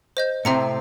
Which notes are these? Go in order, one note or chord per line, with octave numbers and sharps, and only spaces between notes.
C5 D#5 G6
A2 C3 C4 E5 A#5 C#7